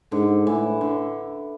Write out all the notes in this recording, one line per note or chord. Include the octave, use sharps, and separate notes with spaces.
G#2 D3
A2 E3
D3